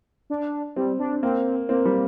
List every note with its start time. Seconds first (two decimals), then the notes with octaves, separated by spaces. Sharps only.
0.30 D4
0.76 G3 C4
0.99 D4
1.23 A#3 C4
1.69 A#3 C4
1.85 G3